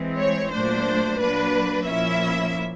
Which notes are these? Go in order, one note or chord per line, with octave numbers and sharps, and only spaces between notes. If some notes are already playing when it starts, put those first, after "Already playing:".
Already playing: E3 G#3 C4
C#5
A#2 F#3 A3 D4 C5
F#3 A#3 D4 B4
A#2 F3 A#3 C#4 E4 E5